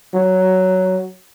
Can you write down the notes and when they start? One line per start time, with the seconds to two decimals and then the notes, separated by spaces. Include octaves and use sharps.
0.14 F#3